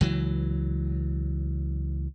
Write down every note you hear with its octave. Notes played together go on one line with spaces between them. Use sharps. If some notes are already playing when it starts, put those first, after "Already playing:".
C#2 E3 F#3